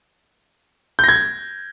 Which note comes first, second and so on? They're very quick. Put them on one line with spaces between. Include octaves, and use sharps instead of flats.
G6 A#6 G#6